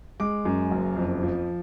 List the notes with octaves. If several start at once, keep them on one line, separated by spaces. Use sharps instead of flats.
G#3 D6
F#2
F#1
F2
F3